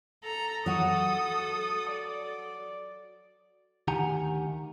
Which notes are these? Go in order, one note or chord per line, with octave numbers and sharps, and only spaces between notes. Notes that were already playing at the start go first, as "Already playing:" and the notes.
A4 A#5
F#3 F#4 D#6
D5
D2 D#3 G4 F#5 G#5 A#5